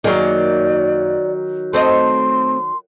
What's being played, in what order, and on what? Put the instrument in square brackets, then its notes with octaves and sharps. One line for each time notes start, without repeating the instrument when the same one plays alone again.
[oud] F#2 A#3 G#4 [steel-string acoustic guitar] D#3 F#3 [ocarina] D5
[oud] A3 C4 D#5 [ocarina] C6